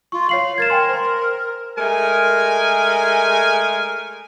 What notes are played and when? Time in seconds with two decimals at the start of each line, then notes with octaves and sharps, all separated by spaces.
0.12 F4 C#6
0.29 C#5 F5 C7 F#7
0.58 A#4 G#6 A6 E7
0.70 G5 G#5 C6
0.89 C5 C6
1.79 G#3 A3 A#4 G#5